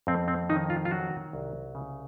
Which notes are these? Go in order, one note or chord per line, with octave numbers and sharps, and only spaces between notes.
F2 C4
C4
D#3 D#4
F4
F4
F#3 F#4
C2
C#3